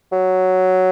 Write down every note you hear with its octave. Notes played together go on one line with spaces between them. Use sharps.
F#3